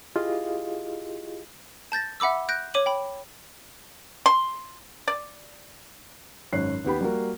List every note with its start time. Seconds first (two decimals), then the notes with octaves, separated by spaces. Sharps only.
0.16 E4 F4 G4 G#4 D#5 F5
1.92 A5 G6 A6 A#6
2.20 E5 F#5 B5 D6 E6
2.49 F#6 G6 A#6 D7
2.74 C#5 D6 D#7 F#7
2.86 G5 B5
4.26 C6
5.08 D5
6.53 G#1 F#2 C#5 F#6 C7
6.85 D#2 B3 G4 B5
7.01 G3 A#3 F#4 A#4